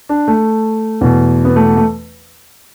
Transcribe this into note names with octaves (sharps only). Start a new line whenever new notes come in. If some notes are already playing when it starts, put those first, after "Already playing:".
D4
A3
E2 B2
B3
A3
A3